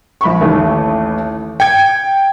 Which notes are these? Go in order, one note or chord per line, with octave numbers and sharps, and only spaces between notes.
A#1 B5 C#6
A1 D#2 A3
G5 G#6 C#7